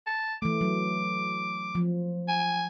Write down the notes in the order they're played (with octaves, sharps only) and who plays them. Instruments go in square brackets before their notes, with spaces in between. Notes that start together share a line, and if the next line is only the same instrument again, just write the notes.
[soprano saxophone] A5
[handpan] E3 A3 [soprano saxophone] D6
[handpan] F#3
F3
[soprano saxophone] G#5